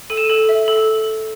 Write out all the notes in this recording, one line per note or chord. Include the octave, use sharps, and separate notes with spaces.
A4 D#7
E7
A4 D#7
E5
A4